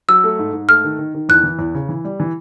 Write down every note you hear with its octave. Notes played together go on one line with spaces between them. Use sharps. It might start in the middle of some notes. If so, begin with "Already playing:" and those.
F#3 E6
A3
G#2
G#2
A3 F6
D#3
D#3
D#3
E2 F#6
E3
E2
C#3
E3
G3
E3